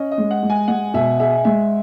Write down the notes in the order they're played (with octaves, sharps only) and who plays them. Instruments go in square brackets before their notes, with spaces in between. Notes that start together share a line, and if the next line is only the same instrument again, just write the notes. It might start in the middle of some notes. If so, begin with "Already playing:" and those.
Already playing: [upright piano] C#4 [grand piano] D#5
[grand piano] D#5
[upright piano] G#3
[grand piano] F#5
[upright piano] G#3
[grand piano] G#5
[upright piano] G#3 [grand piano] F#5
[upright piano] B2 [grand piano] E5
[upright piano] G#4 [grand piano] E5
[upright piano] G#3 [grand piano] E5